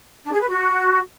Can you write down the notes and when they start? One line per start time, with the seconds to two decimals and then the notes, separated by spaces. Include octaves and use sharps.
0.24 D4
0.32 G#4
0.40 B4
0.48 F#4